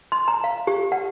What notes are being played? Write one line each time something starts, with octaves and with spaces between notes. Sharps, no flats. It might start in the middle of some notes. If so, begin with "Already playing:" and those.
C6
A#5
F5
G4
F#5